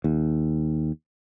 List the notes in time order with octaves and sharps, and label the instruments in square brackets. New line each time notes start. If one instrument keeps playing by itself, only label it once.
[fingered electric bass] D#2